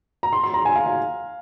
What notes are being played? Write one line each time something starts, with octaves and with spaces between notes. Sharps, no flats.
A#5
C6
C6
A#5
G#5
F5
F5